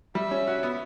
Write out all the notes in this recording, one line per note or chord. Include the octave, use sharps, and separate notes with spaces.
G3 E5
C#4
F#4
B3